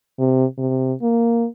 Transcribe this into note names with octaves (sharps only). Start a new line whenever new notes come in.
C3
C3
A#3